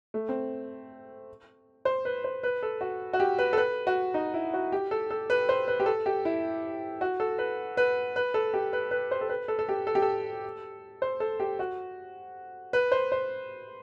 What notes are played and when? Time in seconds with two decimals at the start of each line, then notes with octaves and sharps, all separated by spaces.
0.14 A3
0.29 C4
1.85 C5
2.05 B4
2.24 C5
2.43 B4
2.63 A4
2.81 F#4
3.13 F#4
3.20 G4
3.39 B4
3.53 A4
3.57 B4
3.87 F#4
4.14 D#4
4.34 E4
4.54 F#4
4.72 G4
4.91 A4
5.10 A4
5.30 B4
5.49 C5
5.68 B4
5.80 G4
5.86 A4
6.06 G4
6.25 E4
7.01 F#4
7.20 A4
7.38 B4
7.77 B4
8.16 B4
8.34 A4
8.54 G4
8.73 B4
8.91 B4
9.11 C5
9.21 A4
9.29 B4
9.48 A4
9.59 A4
9.69 G4
9.87 A4
9.95 G4
10.02 A4
11.02 C5
11.20 A4
11.40 G4
11.59 F#4
12.73 B4
12.92 C5
13.12 C5